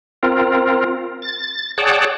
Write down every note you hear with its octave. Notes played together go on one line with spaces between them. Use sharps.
C4 F4 A#4
A6
G#4 C#5 D5 F#5 G5 A5